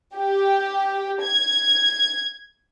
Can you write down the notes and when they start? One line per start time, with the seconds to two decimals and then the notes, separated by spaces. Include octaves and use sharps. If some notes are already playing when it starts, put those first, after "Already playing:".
0.16 G4
1.22 G#6